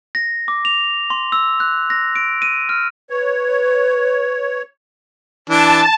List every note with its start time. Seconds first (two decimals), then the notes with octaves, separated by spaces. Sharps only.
0.15 A#6
0.48 D6
0.65 F7
1.10 C6
1.32 E6
1.60 F#6
1.90 A#6
2.15 D7
2.42 D#7
2.69 F6
3.10 B4 C#5
5.50 E3 D4 A5